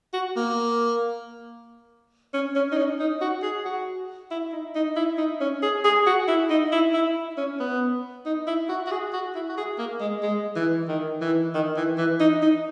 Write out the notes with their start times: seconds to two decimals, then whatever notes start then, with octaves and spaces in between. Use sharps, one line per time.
0.14 F#4
0.37 A#3
2.34 C#4
2.56 C#4
2.72 D#4
2.77 C#4
3.00 D#4
3.21 F#4
3.43 G#4
3.65 F#4
4.31 E4
4.52 D#4
4.75 D#4
4.96 E4
5.18 D#4
5.41 C#4
5.63 G#4
5.85 G#4
6.06 F#4
6.28 E4
6.50 D#4
6.72 E4
6.94 E4
7.37 C#4
7.60 B3
8.26 D#4
8.47 E4
8.69 F#4
8.87 F#4
8.91 G#4
9.13 F#4
9.35 E4
9.49 F#4
9.57 G#4
9.79 A#3
10.00 G#3
10.23 G#3
10.56 E3
10.88 D#3
11.21 E3
11.54 D#3
11.77 E3
11.98 E3
12.20 D#4
12.42 D#4